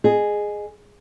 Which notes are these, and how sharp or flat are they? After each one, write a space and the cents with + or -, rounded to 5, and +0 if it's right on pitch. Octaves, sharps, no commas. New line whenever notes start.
G#4 +0 D#5 -25